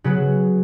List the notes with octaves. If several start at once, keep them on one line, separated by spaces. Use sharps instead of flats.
C#3 F#3 B3